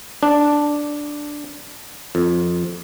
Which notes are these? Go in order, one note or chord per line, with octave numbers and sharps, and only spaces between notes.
D4
F2